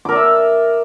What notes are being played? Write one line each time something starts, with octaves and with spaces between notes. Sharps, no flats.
A#4 D5 E5 D6